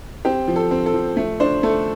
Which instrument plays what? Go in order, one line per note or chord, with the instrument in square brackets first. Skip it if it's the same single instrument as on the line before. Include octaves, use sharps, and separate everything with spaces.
[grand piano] C4 G4
F3
A4
C4
A4
F3
A3
D4 C5
A3 A4